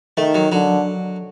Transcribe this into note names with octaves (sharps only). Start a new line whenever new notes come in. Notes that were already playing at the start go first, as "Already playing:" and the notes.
D#3 A3
F#3
D3 F#3